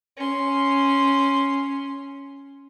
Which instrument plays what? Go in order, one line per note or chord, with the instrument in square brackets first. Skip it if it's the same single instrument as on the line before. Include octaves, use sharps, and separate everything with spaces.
[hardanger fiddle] C#4 C6